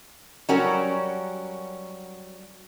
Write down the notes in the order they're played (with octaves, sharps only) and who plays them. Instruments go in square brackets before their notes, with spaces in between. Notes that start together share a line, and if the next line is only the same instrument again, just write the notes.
[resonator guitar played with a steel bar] F#3 G3 C#4 F#4 A#4